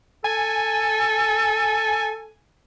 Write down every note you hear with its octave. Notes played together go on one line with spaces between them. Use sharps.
A4 G#5